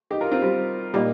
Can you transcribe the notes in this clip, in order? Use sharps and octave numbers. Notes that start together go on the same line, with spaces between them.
D#4 G4
F4 A#4
C4 F4
G3 C4
A#2 G3 A#3 D#4